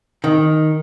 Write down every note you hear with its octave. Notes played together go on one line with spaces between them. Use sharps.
D#3